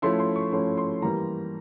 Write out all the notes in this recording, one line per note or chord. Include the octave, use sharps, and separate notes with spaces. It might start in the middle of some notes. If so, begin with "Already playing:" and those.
F3 A3 C#4 E4 C6
C6
C#6
F3 A3 C#4 E4 C6
C6
E3 G3 A#3 A#5